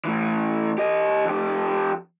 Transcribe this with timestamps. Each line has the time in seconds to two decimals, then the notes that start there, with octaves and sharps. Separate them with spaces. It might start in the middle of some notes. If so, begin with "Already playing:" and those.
0.05 A2 E3
0.78 G4 D#5
1.25 F2 G4